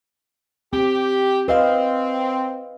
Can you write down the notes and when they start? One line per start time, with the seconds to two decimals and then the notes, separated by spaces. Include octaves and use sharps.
0.73 C4 G4
1.48 C4 B4 D#5 F5